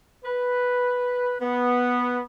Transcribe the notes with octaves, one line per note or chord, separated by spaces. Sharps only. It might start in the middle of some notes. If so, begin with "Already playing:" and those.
B4
B3